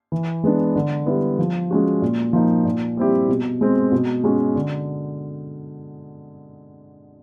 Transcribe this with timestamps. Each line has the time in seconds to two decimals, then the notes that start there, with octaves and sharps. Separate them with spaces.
0.12 E3
0.44 G#3 B3 D4
0.76 D3
1.06 G3 B3 E4
1.39 F3
1.71 G#3 C#4 F#4
2.02 A#2
2.33 F3 A#3 D#4
2.65 A#2
2.97 G3 C4 E4 G4
3.29 B2
3.61 G#3 C4
3.92 B2
4.24 G#3 C#4 F#4
4.55 D3